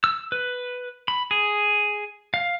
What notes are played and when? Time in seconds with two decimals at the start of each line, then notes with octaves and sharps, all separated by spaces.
0.04 E6
0.32 B4
1.08 B5
1.31 G#4
2.34 F5